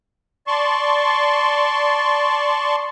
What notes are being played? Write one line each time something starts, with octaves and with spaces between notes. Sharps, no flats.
D5 A5 C6 C#6